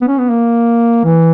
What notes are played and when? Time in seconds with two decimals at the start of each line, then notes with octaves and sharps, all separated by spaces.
0.01 B3
0.08 C#4
0.19 B3
0.30 A#3
1.04 E3